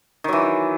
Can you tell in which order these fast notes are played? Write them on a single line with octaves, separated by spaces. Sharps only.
D#3 F#3 E3